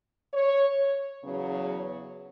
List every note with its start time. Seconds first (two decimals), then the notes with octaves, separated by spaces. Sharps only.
0.34 C#5
1.23 E2 C#3 F#3
1.67 C#5